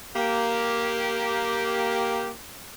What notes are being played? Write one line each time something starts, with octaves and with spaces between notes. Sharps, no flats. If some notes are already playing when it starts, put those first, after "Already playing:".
A#3 G4